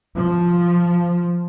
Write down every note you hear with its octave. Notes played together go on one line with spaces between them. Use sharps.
F3